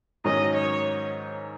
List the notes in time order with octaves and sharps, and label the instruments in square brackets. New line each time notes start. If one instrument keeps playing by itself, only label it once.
[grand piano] G#2 D#3 F#3 C#4 [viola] D#5
[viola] C#5